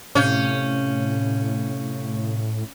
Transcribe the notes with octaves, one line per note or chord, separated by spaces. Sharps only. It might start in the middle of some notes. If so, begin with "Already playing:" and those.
A2 C3 C#4 F5 G6